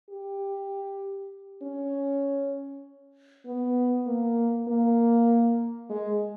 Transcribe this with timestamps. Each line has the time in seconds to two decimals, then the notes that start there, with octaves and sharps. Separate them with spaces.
0.10 G4
1.62 C#4
3.46 B3
4.06 A#3
4.68 A#3
5.90 G#3